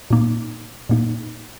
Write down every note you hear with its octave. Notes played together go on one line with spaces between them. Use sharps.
A#2 A#3 D#4
A#2 A#3 D#4